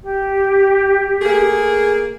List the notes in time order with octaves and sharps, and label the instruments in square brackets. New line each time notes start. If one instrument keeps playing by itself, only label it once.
[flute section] G4
[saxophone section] A3 A#3 G#4